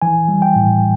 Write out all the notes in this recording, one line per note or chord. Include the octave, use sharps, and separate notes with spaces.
E3 G#5
G3
G5
A2